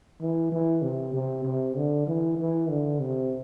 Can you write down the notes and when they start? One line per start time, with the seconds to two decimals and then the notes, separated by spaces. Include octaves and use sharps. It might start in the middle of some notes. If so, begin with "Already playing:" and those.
0.21 E3
0.52 E3
0.82 C3
1.13 C3
1.45 C3
1.76 D3
2.07 E3
2.38 E3
2.70 D3
3.00 C3